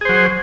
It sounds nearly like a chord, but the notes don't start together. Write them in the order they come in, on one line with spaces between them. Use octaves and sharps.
G#4 C5 F#3